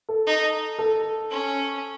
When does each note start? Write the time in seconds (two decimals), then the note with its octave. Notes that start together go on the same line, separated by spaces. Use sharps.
0.09 A4
0.27 D#4
0.79 A4
1.30 C#4